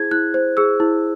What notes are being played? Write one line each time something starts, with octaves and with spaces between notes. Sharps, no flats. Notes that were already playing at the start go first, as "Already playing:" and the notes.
Already playing: E4 G#4 C5 G#6
E4 F#6
C5
G#4 E6
E4